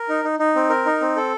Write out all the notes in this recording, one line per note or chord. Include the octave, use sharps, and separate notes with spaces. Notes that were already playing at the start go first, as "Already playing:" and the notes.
Already playing: A#4
D#4
D#4
D#4
C4
A#4
D#4
C4
A4